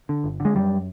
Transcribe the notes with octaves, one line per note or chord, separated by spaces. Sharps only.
D3
G1
D3
G#3
F#2 G3